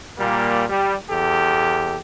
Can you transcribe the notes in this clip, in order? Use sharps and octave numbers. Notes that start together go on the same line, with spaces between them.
A#2 G3 A#3
G3
E2 G4 A4